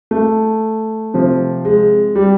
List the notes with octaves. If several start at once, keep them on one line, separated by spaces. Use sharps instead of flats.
A3
C3 F3
G#3
G3